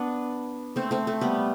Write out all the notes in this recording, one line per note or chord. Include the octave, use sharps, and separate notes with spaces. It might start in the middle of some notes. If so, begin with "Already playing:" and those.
Already playing: B3 D4
A3 C4
A3 C4
A3
G3 B3